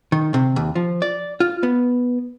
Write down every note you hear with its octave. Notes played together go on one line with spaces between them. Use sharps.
D#3
C3
D#2
F3
D5
F4
B3